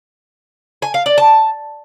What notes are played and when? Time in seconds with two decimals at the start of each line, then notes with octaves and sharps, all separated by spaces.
0.82 G#5
0.94 F5
1.06 D5
1.18 A5